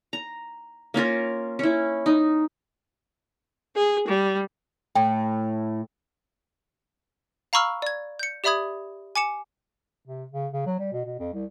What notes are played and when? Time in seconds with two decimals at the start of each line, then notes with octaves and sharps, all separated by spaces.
0.13 A#5
0.94 A#3 C#4 F4 A#4
1.59 C#4 E4
2.06 D#4
3.75 G#4
4.08 G3
4.95 A2 G5
7.53 F5 A#5 B5 C#6 E6 F6
7.82 D5 G#6
8.19 G6 C#7
8.44 G4 D5 E5 B5 D#6 G#6
9.16 G#5 D6 C#7 E7
10.06 C3
10.32 C#3
10.53 C#3
10.66 F#3
10.80 G3
10.92 B2
11.05 B2
11.19 F2
11.34 C2